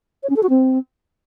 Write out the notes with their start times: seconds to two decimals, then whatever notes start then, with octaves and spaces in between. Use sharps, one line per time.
0.23 C#5
0.30 C#4
0.36 A4
0.43 F#4
0.49 C4